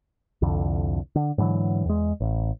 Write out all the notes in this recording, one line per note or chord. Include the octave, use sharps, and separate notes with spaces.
C2 F2 D3
D3
G#2 D3 E3 F#3
E2 G#3
A1